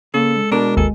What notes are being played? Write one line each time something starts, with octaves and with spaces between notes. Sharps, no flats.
C#3 A#3 A4
G#3
B2 D4 A4 A#4
G#1 D#2 A4 G#5